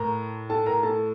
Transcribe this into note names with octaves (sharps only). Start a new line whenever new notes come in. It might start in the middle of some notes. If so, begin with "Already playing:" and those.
Already playing: A2 A3 A#4 A#5
A4 A5
A#4 A#5
A4 A5